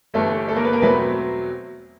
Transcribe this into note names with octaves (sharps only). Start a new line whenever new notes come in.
G1 G2 E3 A3 A4
A3 A4
A#3 A#4
B3 B4
A#3 A#4
E2 B2 F#3 A3 B3 C4 B4